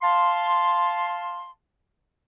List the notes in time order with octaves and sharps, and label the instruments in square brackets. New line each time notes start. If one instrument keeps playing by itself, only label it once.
[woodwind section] F5 A5 C6